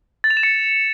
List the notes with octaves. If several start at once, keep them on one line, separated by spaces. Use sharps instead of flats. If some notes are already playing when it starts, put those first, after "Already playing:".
A6
F7
E7
C#7